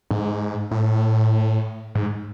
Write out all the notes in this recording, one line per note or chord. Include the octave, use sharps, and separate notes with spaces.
G#2
A2
G#2